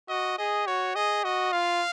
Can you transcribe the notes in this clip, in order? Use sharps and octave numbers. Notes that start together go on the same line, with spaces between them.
F#4 D#5
G#4 D#5
F#4 C#5
G#4 D#5
F#4 D#5
F4 F5